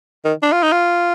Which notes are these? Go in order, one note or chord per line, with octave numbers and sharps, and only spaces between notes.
D#3
D4
F4
D#4
F4